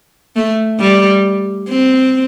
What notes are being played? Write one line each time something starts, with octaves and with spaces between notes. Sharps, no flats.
A3
G3
C4